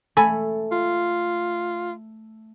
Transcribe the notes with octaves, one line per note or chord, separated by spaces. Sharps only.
A3 A4 G#5 B5
F4